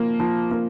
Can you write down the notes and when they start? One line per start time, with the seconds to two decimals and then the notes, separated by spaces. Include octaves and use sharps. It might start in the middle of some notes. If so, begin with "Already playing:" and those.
Already playing: F3 A#3
0.20 F3
0.51 A#3